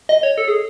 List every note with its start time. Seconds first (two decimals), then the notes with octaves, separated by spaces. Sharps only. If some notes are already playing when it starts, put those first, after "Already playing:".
0.09 D#5
0.23 C#5
0.38 A4
0.48 G#4